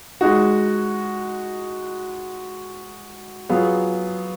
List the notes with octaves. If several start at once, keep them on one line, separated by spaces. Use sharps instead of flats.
G#3 D#4 F#4
F#3 B3 F4 G#4